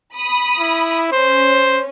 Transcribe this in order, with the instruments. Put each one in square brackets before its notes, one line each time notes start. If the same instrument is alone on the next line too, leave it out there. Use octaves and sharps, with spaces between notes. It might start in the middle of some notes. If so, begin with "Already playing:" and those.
[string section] B5 D#6
[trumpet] E4
[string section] C#4 [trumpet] C5